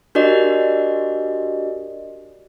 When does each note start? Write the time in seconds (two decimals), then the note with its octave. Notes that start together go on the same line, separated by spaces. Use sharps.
0.15 D4 F#4 G4 A#4 D5 D#5